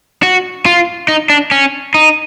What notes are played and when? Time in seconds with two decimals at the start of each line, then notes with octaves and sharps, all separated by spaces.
0.23 F#4
0.66 F4
1.08 D#4
1.30 D4
1.51 C#4
1.94 D#4